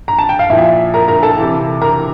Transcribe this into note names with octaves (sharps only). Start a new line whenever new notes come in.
A#5
A5
G5
F5
A#2 F3 E4 E5
A#4 A#5
A#4 A#5
A4 A5
C3 E3
A#4 A#5